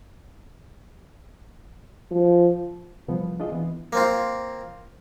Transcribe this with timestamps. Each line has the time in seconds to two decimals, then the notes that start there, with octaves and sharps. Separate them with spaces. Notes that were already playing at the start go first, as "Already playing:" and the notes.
2.11 F3
3.08 C2 F3 B3
3.40 D4 F4 G#4 D#5
3.52 E3 B3
3.93 A#3 C4 F4